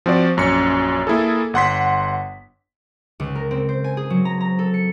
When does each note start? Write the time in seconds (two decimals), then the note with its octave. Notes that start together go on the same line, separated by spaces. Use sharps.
0.06 F3 C4 F#4 D5
0.37 A#1 F#2 C#4 C#7
1.07 A#3 E4 G#4 A4
1.54 G1 F#5 C6 B6
3.20 C#2
3.35 A#4
3.51 C4
3.69 C5
3.84 G#5
3.97 G#4
4.10 F#3
4.25 A#5
4.41 A#5
4.59 A4
4.74 C#7